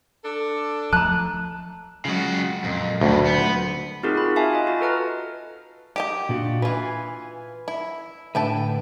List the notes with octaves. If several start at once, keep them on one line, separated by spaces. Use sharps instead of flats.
D4 A4
F3 A3 A5 A#5 F#6
C#3 F#3 G#3 F4 F#4
F2 A#2
D2 G2 B2
B3 C4
C4 D#4 F4 F#4 G#4 A#4
B5
E5 F5 G#5 A5
F4 D#5
F#4 A6
A4 B4 A#5 F6
G4 D#5 G5
A#2 D4 F#4
E3 F4 B4 G#5
E4
A2 D3 E4 B4 G5 A5